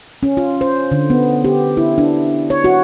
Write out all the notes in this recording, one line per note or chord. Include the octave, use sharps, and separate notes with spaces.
C#4
F4
C5
D3
B3
G4
E4
D4
C#5
F#4